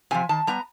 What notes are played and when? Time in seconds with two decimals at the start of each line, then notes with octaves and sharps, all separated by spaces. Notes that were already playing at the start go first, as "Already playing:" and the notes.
0.11 C3 F3 G#5
0.29 D#3 A5
0.47 G3 B3 A#5